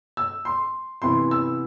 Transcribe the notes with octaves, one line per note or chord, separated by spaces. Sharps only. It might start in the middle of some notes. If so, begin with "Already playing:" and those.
E6
C6
C3 E3 B3 E4 C6
E6